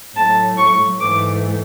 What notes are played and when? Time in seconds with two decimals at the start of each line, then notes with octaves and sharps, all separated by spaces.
0.15 A2 F#3 A3 A5
0.57 C#6
1.00 G#2 E3 A3 D6